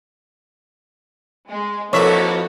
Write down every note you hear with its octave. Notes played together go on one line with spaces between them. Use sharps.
G#3
F2 A#3 E4 F#4 A4 B4 C#5 E5